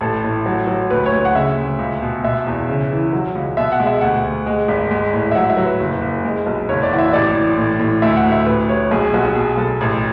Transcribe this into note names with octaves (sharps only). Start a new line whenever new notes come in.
A1 A4
A2
F#3
F#3
D2 B4
C#5
D2
F#5
C#3 E5
D2
C#2
B2
B2 E5
E2
C#3
E3
F#3
C#2
B2 E5
F#5
G#3
E5
D2 F#5
D2
G#3
G#1
G#3
A2
E5
F#3 F#5
E5
F#3
B4
F#1
F#1
G#3
B1
F#1 C#5
D5
E3 F#5
E5
A1 D5
E3
A2
A2
D2 E5
F#5
D2
E5
A1 B4
A1 C#5
B1 G#4
G#4
B1 F#4
F#4
B2 G#4
B1 A4
A1